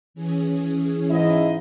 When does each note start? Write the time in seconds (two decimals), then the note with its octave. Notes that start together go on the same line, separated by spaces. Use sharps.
0.14 E3 C#4 G#4
1.11 G#2 E4 D#5